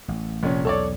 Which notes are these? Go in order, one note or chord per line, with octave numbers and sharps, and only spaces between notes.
A1
F1 A#1 C#4
B1 E2 A4 C#5 D5